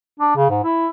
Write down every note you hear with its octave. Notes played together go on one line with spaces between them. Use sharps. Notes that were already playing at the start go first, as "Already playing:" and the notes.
D4
C#3
G#2
E4